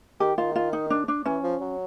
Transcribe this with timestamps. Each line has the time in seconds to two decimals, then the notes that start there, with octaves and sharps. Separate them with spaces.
0.20 D#3 G4
0.37 D#3 F4
0.56 F4
0.73 D#4
0.90 D4
1.08 D4
1.26 E3 C#4
1.43 F3
1.61 F#3